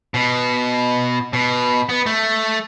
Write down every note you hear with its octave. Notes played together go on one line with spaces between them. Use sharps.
B2
B2
B3
A3